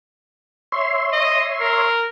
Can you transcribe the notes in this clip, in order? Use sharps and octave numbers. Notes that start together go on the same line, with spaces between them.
C#5 E5 C6
D#5
A#4